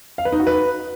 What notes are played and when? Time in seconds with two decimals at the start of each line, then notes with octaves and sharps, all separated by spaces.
0.18 F5
0.25 B4
0.32 D#4
0.40 F#4
0.47 B4